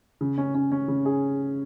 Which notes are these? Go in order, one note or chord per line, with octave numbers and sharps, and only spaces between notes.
C#3
C#4
C#4
C#4
C#3
G#4